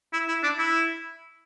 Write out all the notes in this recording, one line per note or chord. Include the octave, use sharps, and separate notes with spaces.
E4
E4
D4
E4